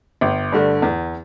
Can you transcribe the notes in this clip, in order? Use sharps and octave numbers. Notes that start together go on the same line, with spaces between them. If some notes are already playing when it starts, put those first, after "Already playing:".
G1
G2 D3 A3
E2